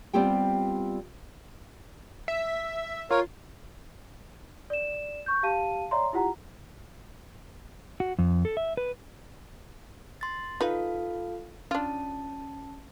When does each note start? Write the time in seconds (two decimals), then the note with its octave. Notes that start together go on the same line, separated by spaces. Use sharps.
0.13 G3 B3 C4 F4 G4 G5
2.28 E5
3.11 F4 A#4 C#5
4.70 D5 E7
5.26 C#6 G6
5.43 G4 F5 A5 D#7
5.91 C#5 D5 E5 A#5 C6
6.13 E4 F4 G4 F#5 A#5
8.00 F#4
8.19 F2
8.45 A4
8.57 E5
8.77 B4
10.21 C6 A6
10.61 D#4 F4 A4 B4 F5
11.71 C#4 D4 F4 A5